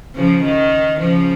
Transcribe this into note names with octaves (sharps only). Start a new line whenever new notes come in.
C#3 F3
D#3
C#3 F3